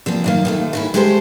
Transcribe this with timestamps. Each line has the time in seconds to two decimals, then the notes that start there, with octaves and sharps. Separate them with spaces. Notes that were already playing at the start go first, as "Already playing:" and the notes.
0.06 E2 F3 A#3 C4
0.24 F#2 D#3 A#3
0.45 D#2 D#3 A3
0.73 D#3 C#4 E4
0.94 G#3 A3 G4 A4 A#4 C5